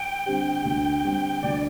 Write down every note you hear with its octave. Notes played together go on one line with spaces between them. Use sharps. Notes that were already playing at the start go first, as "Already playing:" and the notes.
Already playing: G5
D3 G3 C4 G4
D2
D3 G3 C4 G4
D2 D5